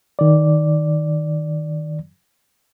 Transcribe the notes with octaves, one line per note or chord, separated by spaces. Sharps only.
D#3 D5